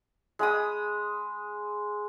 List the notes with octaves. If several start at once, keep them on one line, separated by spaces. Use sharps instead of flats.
G#3 B5 D#6